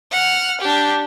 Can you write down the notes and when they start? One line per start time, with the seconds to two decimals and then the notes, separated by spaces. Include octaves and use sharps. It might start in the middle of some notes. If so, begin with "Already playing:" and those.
0.12 F#5 F6
0.61 D4 G4